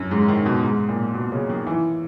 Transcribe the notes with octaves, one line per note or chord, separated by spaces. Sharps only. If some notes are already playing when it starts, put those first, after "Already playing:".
Already playing: F#2
G#2
D#3
B2
G#2
A#2
B2
C#3
D#3
E3